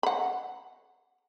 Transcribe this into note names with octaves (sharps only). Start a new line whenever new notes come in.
F#5 B5